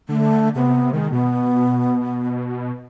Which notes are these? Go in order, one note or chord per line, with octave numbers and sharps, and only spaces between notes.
D3 A3
C3 B3
D#3 G#3
B2 B3